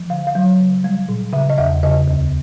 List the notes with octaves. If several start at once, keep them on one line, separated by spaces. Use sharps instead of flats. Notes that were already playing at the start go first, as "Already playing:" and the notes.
Already playing: F3
D3 F5
F5
F#3
C#3
G3
A#2
C#3 E5
D#5
E2 E5
C#3 D#5
D2